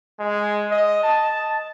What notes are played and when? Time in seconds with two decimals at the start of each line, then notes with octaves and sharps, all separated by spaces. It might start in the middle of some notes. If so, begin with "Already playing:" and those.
0.19 G#3
0.71 D#5
1.03 A5